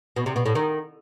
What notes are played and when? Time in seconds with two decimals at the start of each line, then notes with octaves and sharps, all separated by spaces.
0.16 B2
0.26 C3
0.36 B2
0.46 A2
0.55 D#3